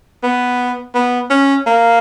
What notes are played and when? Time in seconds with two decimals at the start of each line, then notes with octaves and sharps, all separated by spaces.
0.23 B3
0.94 B3
1.30 C#4
1.66 A#3